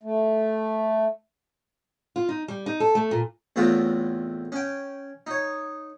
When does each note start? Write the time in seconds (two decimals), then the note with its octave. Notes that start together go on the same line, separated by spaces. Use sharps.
0.03 A3
2.16 F4
2.29 D#4
2.48 G3
2.66 D#4
2.80 A4
2.95 A3
3.11 A#2
3.56 E2 A2 C4 F4 F#4
4.52 C#4 G5
5.27 D#4 C#5